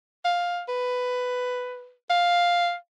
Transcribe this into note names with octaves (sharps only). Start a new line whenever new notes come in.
F5
B4
F5